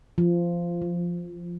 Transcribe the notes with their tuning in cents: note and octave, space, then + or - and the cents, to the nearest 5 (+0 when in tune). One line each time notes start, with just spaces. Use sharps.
F3 -15
F3 +5